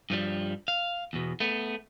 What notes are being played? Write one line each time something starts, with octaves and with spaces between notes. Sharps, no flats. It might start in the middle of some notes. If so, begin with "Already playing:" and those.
G2 F3 G3
F5
E2 B2
A3 B3